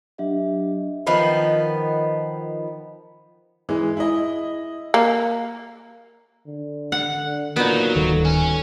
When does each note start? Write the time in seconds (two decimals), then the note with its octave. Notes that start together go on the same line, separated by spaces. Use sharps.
0.18 F#3 D4 G4 D#5 E5
1.07 D#3 F3 B3
3.69 E3 G#3
3.97 E4 D#5
4.94 A#3
6.47 D3
6.92 F#5
7.24 D3
7.56 A#2 F#3 B3 D#4
7.96 D1 D#3 G3 A4
8.25 C#4